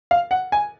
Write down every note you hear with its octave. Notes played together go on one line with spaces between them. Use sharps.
F5
F#5
G#5